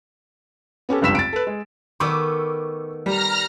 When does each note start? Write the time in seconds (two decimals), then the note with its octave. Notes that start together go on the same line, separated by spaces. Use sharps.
0.89 B3 C#4 G4 A4
1.02 F1 C#2 G2 E6 B6 E7
1.15 A6 D7
1.33 A4 B4
1.47 G#3
2.00 D#3 A3 B3 C#6 D6 E6
3.06 G3 A#5 F6 A#6